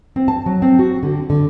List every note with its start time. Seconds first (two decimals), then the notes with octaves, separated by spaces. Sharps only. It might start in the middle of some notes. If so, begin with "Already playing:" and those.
0.16 C4
0.28 A5
0.46 F#3
0.62 C4
0.79 F#4
1.03 D3
1.30 D3